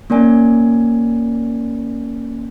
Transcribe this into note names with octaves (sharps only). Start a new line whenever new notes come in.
A#3 C#4 A#4 D5 G#5